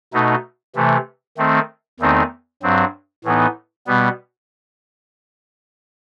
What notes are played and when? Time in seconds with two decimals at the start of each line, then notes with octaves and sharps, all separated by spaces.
0.13 B2 A3 D#4
0.75 C3 E3 A3
1.38 D#3 A3 C4
2.00 E2 D#3 A3 C4 D#4
2.63 G2 F#3 C4
3.24 A2 E3 B3 D#4
3.87 B2 G3 B3